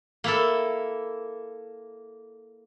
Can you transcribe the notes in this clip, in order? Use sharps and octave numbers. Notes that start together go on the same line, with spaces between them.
A#3 E4 A4